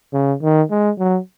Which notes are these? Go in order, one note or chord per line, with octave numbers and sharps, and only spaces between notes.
C#3
D#3
G#3
F#3